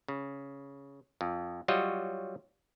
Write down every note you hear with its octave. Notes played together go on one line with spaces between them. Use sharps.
C#3
F2
F#3 G3 F4 F#4 C#5 D#5